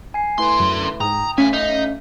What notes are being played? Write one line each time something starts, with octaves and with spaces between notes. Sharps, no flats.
G#5 C7
D3 A3 E4 B4 C6
F#2
G#2 G5 A#5 D#6
F2 A3 C#4 F5 G#5 B6
D#4